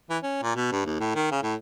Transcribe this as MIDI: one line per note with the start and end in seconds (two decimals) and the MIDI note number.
0.10 0.18 52
0.23 0.40 61
0.43 0.54 46
0.56 0.67 47
0.72 0.82 43
0.86 0.99 39
1.00 1.13 45
1.15 1.28 51
1.32 1.41 49
1.43 1.55 45